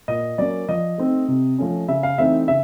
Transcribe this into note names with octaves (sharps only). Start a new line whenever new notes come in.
A#2 D#5
F#3 A#3 C#4 D5
F3 D#5
A3 C4 D#4
C3
F3 A3 C#4
C#3 E5
F5
E3 A3 C4 D#4 E5
C#3 E5